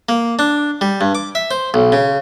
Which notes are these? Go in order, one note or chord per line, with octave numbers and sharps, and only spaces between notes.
A#3
D4
G3
G2
D6
E5
C5
B1
C#3